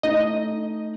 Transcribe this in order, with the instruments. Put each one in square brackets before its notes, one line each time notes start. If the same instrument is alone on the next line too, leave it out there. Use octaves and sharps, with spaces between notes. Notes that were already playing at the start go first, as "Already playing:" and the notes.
[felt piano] A3 D#4 [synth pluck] D#5